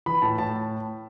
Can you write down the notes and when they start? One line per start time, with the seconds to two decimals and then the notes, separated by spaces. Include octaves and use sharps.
0.06 E3 B5
0.22 A2 A5
0.38 A2 A5